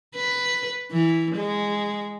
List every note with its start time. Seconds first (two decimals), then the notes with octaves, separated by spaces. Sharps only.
0.15 B4
0.92 E3
1.35 G#3